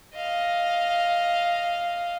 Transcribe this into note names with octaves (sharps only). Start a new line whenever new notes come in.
D#5 F5